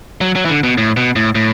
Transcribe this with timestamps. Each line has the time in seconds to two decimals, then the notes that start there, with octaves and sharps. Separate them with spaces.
0.21 F#3
0.36 F#3
0.45 E3
0.49 D3
0.63 B2
0.78 A2
0.97 B2
1.16 A2
1.35 A2